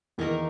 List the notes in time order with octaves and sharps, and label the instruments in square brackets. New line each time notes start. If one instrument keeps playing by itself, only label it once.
[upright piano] E2 E3 [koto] D#3 A#3 D#4 A#4